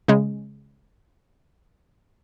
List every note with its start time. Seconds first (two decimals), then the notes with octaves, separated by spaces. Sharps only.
0.08 C#3 G#3